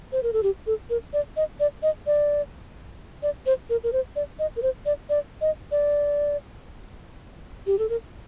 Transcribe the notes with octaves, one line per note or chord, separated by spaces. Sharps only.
C5
A#4
A4
G4
A4
A#4
D5
D#5
D5
D#5
D5
D5
C5
A#4
A#4
C5
D5
D#5
A#4
C5
D5
D5
D#5
D5
G4
A4
A#4